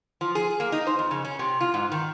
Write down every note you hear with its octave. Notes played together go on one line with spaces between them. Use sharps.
F3
G#4
A#3
D#4
C5
F2
C#3
C#4
C3
F4
G#2
D#3